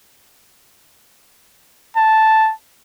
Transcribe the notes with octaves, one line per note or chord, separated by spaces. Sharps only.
A5